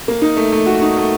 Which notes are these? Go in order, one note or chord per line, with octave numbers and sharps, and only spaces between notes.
A#3
D#4
A3
A3
F#4
D#4
A3